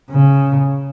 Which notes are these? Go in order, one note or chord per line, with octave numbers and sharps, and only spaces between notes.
C#3